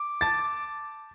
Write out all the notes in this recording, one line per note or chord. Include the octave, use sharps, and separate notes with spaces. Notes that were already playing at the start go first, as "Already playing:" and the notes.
Already playing: D6
A5 A6